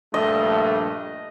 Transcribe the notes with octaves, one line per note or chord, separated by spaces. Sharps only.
A#1 G2 A3 D#5